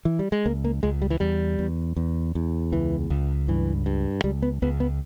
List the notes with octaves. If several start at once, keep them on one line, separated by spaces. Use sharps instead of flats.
E3
G3
G#3
C#2 A#3
A#3
C#2 G#3
G3
E3
E2 G3
E2
E2
E2
C#2 E3
C#2
G2 E3
G2
C#2 G3
B3
C#2 B3
B3